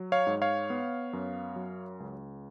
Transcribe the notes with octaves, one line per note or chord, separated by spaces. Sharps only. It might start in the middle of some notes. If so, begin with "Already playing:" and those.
Already playing: F#3
C#5 F5
G#2
C#5 F5
B3
F#2
F#3
C#2